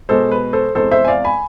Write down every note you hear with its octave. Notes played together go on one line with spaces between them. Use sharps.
B2 G#3 A4 C5
B4
A4 C5
E2 C3 G#3 A4 C5
C5 E5
G#5
D5 F5
G#5 B5